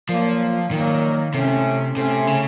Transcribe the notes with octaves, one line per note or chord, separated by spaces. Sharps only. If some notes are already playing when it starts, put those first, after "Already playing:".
A#2 F3 F#3 A#3
A#2 D#3 F#3 A#3
A2 C3 A3 C#4
A2 C3 A3 C#4
C#3